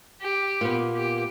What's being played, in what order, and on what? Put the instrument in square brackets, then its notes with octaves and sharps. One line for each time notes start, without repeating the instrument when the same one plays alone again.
[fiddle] G4
[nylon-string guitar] A#2 B3
[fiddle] G4